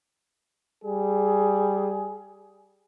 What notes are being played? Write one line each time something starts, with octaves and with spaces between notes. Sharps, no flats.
G3 G#4